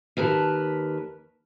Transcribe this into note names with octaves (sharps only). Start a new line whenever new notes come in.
D#2 A#4 B4 A5